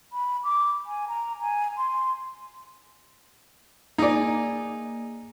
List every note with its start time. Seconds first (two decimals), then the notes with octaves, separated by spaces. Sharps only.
0.13 B5
0.44 D6
0.86 G#5
1.08 A#5
1.41 G#5
1.77 C6
3.98 A#3 D#4 G#4 D5 G#5